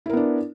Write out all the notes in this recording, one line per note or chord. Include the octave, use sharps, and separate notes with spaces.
B3 D4 E4 A#4